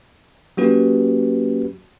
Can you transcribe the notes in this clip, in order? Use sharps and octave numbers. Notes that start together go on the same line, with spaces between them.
F#3 A#3 C#4 F#4 G4 B4